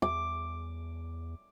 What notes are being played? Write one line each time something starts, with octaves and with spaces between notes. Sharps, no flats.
E2 D6